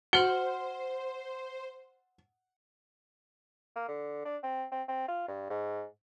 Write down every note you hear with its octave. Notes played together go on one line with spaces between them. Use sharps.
F#4 C5 F#5 F6 F#7 G7
A#3
D3
D4
C4
C4
C4
F4
G2
G#2